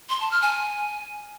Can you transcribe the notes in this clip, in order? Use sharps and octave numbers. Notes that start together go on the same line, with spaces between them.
C6
A5
F6
G#5